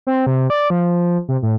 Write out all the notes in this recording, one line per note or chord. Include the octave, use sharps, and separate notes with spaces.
C4
C3
D5
F3
C3
A2